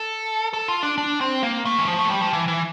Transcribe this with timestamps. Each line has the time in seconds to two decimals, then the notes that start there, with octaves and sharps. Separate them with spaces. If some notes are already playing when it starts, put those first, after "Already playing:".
Already playing: A4
0.53 A4
0.68 F4
0.83 D4
0.98 D4
1.21 C4
1.43 A#3
1.65 A3
1.78 E3
1.88 F3
1.99 A3
2.05 F3
2.10 G3
2.21 F3
2.33 E3
2.48 E3